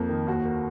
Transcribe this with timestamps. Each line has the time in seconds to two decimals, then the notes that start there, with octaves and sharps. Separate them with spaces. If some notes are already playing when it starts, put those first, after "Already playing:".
Already playing: F2 A#3
0.09 D#3
0.27 D#2 F#4
0.45 A#3